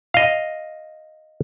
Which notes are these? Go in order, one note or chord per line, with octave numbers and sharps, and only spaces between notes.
D#5 F5